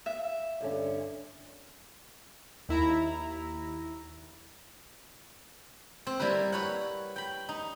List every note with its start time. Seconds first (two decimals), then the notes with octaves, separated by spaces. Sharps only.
0.06 E5
0.61 G2 D3 C#4
2.69 D#2 E4 A#5
6.07 C4
6.20 G3 A#3 E4 B4
6.52 B4 C#5 F#5
7.16 G5 B5
7.49 D#4